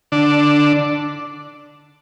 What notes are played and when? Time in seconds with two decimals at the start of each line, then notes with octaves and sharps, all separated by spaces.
0.12 D3 D4